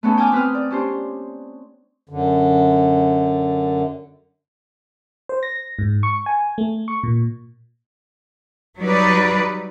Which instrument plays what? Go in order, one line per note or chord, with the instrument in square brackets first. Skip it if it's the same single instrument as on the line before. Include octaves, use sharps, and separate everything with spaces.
[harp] A3 B3 C#4 D#4 A4
G5 G#5 D6 D#6 F6
C4 B4 G5 D#6 F6
D5
C#4 D4 G4 C5
[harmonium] F#2 D3
[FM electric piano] C5
A#6
G#2
C#6
G#5
A3
C#6
A#2
[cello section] F#3 G3 D#4 B4 D5